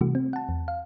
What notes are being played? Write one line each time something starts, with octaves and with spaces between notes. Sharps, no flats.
C3 E3 G3 A3 F#4
C4
F#5 A5
E2
F5